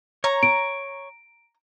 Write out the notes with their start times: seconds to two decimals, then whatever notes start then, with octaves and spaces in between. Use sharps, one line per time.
0.24 C#5 A#5
0.43 D7